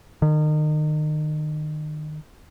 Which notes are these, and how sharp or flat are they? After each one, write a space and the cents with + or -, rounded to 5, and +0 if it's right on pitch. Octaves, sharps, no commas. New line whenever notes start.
D#3 -30